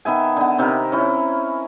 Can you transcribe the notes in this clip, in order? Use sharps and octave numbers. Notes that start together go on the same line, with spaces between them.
D#3 B3 E5 G#5
D3 B3
C3 D#3 A#4 B5
C#4 E4